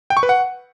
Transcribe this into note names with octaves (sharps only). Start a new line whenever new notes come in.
G5
C#6
B4
F#5